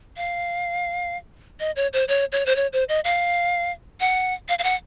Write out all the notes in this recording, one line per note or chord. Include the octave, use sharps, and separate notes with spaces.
F5
D#5
C#5
C5
C#5
C#5
C5
C#5
C5
D#5
F5
F#5
F5
F5
F#5